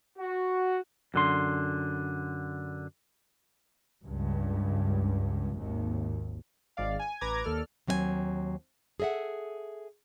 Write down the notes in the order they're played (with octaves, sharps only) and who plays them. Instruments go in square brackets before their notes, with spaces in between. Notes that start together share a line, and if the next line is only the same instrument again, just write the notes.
[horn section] F#4
[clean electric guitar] F#2 D3 C6
[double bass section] C#2 G2
G#1 D#2
[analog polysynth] G#1 G#2 D5 F5
G#5
A1 B4 A#5 D6 G#6
D#2 A4 D5 F6
[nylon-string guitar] D#2 F#3 C4 D#5 G#5
G#4 A4 D#5 E5 F#5